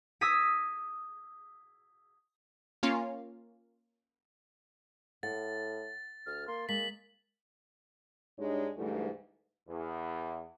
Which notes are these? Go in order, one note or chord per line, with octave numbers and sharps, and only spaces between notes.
D#6 E6 G#6 A#6 B6 D#7
A#3 C#4 F4
A2 F#5 A6
D2 F6
A#3 C6
G#3 A#3 B6 F#7
G2 G#3 D4 D#4 C#5
D2 G#2 E3 G3 A3
E2